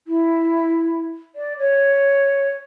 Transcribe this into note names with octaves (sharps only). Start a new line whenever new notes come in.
E4
D5
C#5